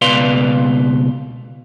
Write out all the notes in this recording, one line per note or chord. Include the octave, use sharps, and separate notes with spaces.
C#2 B2 B4 D5 F5 C6